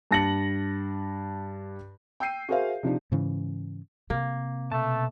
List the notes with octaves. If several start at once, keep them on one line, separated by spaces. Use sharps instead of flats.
G2 A5 A#6 C#7 F#7
G5 E6 G6 C7 D#7
F#4 G#4 A#4 C5 E5 F5
C3 F3 D4 D#4
G#2 C#3 E3
C3 A#3
B2 A3 A5